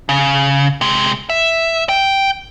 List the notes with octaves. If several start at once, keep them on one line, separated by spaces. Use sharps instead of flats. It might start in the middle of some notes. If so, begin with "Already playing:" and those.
C#3
C3 G#3
E5
G5